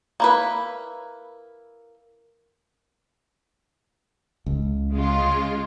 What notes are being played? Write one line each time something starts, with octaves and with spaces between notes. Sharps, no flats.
A#3 E4 B4
C#2
C#3 G#3 F4